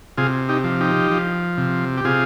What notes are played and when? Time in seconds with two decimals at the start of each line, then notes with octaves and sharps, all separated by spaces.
0.17 C3 F4 G#4
0.49 D#4 G4
0.64 F3
0.81 D#4 G4
1.11 F3
1.58 C3
1.97 G4
2.05 C3 F4 G#4